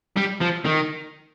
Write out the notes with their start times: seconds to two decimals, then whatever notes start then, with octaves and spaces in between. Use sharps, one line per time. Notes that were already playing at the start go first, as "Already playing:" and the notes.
0.17 G3
0.41 F3
0.65 D#3